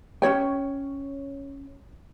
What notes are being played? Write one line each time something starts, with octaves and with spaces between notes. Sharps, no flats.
C#4 D#4 C#5 G5